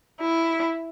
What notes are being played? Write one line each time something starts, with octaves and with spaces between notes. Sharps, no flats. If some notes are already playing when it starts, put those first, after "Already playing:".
E4